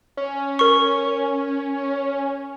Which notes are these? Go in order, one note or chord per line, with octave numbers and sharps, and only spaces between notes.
C#4
A#4 C#6